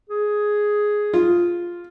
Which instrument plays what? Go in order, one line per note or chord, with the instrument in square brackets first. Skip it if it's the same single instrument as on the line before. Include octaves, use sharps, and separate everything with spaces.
[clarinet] G#4
[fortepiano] F4